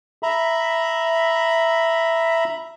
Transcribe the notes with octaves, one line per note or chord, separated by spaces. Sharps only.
E5 A#5 B5